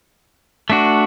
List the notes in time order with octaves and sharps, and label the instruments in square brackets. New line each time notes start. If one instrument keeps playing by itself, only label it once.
[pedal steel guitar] A3 D4 F#4